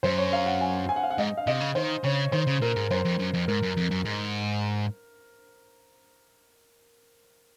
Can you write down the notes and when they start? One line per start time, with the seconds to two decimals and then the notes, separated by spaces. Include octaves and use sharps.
0.03 F#2 C5
0.18 C#5
0.33 F5
0.46 F#5
0.61 G#5
0.89 G#5
0.96 F#5
1.03 F5
1.11 F#5
1.19 G#2 D#5
1.37 F5
1.47 C3 D#5
1.61 C#3
1.75 D#3 C5
2.04 C#3 C#5
2.32 D#3 C5
2.47 C#3
2.62 A#2 A#4
2.76 G#2
2.90 F#2 C5
3.05 F2
3.19 F#2
3.34 F2
3.48 G#2 A#4
3.63 F#2
3.77 F2
3.91 F#2
4.05 G#2